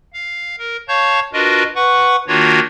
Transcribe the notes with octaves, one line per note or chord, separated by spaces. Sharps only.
F5
A#4
C#5 F5 A5 C#6 G6
D4 F4 F#4 A#4 B4 D#5
B4 F#5 C#6
D#3 A#3 D4 F4 F#4 C#5